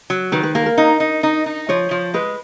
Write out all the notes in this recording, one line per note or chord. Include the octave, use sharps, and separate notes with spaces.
F#3
D#3 B4
B4
A#3 A#4
A#4
D#4
D#4
D#4
D#4
F3 C#5
F3
G#3 B4